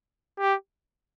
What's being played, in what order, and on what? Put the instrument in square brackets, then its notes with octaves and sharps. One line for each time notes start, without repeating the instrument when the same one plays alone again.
[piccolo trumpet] G4